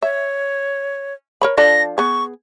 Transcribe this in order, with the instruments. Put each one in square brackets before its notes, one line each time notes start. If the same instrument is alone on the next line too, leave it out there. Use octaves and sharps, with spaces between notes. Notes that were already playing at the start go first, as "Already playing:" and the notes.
[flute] C#5 [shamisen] E5
[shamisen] A#4 C#5 B5
[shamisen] F3 D4 A4 [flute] A#6
[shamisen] B3 G#4 [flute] C#6